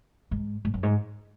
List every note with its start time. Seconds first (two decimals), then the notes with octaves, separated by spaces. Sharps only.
0.31 G#2
0.65 G#2
0.74 F#2
0.83 G#2